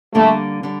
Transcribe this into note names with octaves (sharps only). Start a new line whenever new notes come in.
D3 G3 A3 A#3
D3 G3